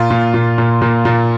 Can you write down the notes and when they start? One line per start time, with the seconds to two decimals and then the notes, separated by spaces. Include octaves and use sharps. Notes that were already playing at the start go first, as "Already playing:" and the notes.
Already playing: A#2 F4
0.10 A#2
0.34 A#2
0.58 A#2
0.82 A#2
1.05 A#2